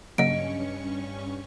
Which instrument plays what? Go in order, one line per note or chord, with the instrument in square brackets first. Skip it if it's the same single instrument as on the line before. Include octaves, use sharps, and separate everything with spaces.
[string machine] G2 C#4 C#6 [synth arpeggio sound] C#3 F#3 A#3 [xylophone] D#5 D7